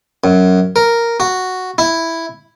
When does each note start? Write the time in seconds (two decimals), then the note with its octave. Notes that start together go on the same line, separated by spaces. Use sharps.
0.24 F#2
0.76 A#4
1.20 F#4
1.78 E4